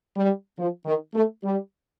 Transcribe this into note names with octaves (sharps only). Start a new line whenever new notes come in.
G3
F3
D#3
A3
G3